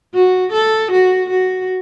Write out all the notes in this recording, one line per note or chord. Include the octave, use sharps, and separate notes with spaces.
F#4
A4
F#4
F#4